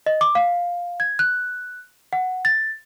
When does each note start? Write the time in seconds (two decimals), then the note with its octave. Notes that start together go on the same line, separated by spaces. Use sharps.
0.06 D#5
0.21 D6
0.35 F5
1.00 G#6
1.19 F#6
2.13 F#5
2.45 A6